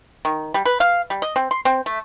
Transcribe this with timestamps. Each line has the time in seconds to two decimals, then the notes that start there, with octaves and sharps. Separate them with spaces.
0.25 D#3
0.54 G3
0.65 B4
0.80 F5
1.10 G3
1.22 D#5
1.36 C4
1.51 C6
1.65 C4
1.86 A3